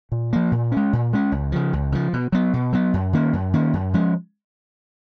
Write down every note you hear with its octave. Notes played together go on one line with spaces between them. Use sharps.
A#2
F3 A#3
A#2
G#3 C#4
A#2
G#3 C#4
C#2
C#3 F3
C#2
C#3 F3
B2
F#3 B3
B2
F#3 B3
F#2
D#3 A#3 C#4
F#2
D#3 A#3 C#4
F#2
F3 G#3 C#4